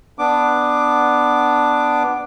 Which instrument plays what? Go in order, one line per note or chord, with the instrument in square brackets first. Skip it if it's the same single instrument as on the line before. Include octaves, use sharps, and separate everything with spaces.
[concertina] B3 D4 D6